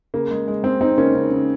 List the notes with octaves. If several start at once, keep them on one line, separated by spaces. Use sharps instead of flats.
C#3 A#3
G#3
G#3
G#3 C4
G#3 C4 D#4
C#3 A#3 C#4
C#3
C#3